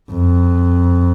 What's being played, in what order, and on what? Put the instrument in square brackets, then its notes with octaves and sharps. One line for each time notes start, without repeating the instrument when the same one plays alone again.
[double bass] F2